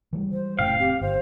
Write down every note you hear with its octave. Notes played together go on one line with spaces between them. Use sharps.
E3 G3 G#3
C5
F1 A2 C#3 F5 G5
C4 G4
G1 C5